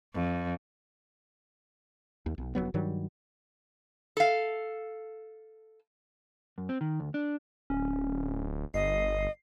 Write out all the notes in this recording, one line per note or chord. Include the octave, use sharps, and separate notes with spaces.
F2
D#2
B1
F1 F2 F#3 B3
G2 D#3 F#3 G3
A4 F5
F#2
C4
D#3
D2
D4
D1 C#4
G1 D#5 C7